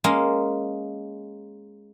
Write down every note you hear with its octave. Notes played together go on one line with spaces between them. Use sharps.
G#3 A#3 C#4